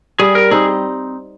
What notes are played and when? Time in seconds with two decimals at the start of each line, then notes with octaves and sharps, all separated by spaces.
0.19 G3 G#4
0.35 A#4
0.51 C4 D#4 G#4